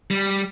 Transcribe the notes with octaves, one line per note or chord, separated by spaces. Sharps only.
G3